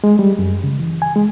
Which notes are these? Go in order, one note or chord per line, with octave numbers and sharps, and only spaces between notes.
G#3
G3
F#2
C#3
E3
G#5
G#3